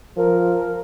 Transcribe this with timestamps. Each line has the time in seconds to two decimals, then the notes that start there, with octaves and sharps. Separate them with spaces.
0.17 F3 A#4